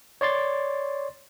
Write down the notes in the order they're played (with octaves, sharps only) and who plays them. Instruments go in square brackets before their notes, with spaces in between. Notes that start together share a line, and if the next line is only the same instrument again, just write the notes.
[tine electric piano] C#5 D5 C6 A6